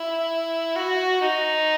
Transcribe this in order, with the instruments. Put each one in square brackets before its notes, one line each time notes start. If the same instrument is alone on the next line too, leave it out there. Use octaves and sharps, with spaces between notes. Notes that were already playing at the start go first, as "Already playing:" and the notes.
Already playing: [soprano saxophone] E4
F#4
D#4